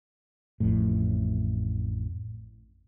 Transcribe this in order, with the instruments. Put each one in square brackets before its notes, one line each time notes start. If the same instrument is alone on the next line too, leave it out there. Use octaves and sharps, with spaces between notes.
[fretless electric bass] A1 F2 A2